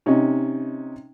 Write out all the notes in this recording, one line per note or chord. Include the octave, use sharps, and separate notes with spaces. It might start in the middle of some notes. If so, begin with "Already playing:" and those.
C3 C#4 D#4